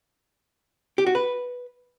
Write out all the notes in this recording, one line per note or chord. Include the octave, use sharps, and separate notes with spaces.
G4
F#4
B4